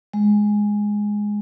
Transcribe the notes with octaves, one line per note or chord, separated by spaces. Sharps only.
G#3